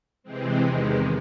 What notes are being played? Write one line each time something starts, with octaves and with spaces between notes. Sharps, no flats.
C3 E3 G#3 C4
E2 C3 D#3 G#3